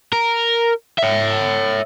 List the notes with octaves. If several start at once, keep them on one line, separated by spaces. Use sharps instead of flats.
A#4
C#5 E5